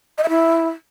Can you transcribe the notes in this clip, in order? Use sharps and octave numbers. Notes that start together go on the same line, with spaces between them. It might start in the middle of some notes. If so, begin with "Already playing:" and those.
D#5
E5
E4